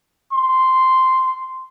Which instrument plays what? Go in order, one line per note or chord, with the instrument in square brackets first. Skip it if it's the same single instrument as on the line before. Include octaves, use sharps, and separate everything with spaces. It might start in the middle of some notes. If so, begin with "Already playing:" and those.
[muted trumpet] C6